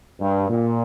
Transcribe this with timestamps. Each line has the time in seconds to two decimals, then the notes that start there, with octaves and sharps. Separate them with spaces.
0.20 G2
0.49 A#2